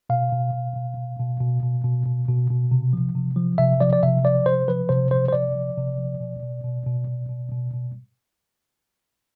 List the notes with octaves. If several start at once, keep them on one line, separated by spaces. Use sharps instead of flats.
B2 F5
B2
B2
B2
B2
B2
B2
B2
B2
B2
B2
B2
C3
F3
C3
F3
C3 E5
F3 D5
D5
C3 E5
F3 D5
C3 C5
F3 B4
C3 C5
F3 C5
C5
C3 D5
F3
C3
F3
B2
B2
B2
B2
B2
B2
B2
B2